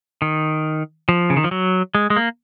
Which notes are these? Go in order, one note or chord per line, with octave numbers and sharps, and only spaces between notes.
D#3
F3
C#3
D#3
F3
F#3
G#3
G#3
A#3